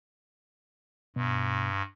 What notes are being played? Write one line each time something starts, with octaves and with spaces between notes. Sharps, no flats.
G2 B2